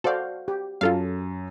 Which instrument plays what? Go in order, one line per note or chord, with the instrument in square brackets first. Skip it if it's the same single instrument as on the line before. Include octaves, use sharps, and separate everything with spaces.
[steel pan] F#4 C5 F5 [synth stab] A4 D5
[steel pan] G4
[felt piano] F#2 [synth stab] F4 A4 F5